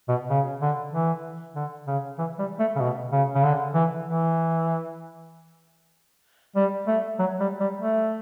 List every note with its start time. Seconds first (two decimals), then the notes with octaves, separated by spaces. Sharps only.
0.09 B2
0.30 C#3
0.62 D3
0.93 E3
1.56 D3
1.87 C#3
2.18 E3
2.39 G3
2.59 A3
2.76 C#3
2.80 B2
3.12 C#3
3.35 C#3
3.43 D3
3.74 E3
4.06 E3
6.56 G3
6.87 A3
7.19 F#3
7.40 G3
7.60 G3
7.81 A3